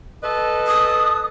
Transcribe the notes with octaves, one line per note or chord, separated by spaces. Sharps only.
A4 B4 D#5
D#6